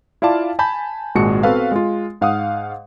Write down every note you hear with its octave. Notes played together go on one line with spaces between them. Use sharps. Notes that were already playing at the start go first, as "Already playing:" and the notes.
E4 F4 D5 F5 A5 D6
G#5 A5 B5 G6 B6
G#1 A#2 G#3 F#4 A5 C#7
B3 C4 F#4 A4 B4 F5
G#3 F4
G#2 F5 F#5 D#6